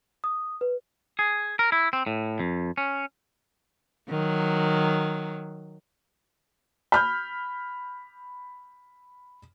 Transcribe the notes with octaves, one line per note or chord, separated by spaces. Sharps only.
D#6
B4
G#4
A#4
E4
C4
A2
F2
C#4
D#3 F#3
B5 F6 G6